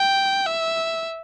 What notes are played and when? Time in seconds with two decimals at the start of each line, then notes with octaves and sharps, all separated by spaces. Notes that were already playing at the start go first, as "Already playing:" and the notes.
Already playing: G5
0.46 E5